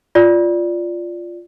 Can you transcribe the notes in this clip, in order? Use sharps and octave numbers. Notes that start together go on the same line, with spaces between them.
F4 D5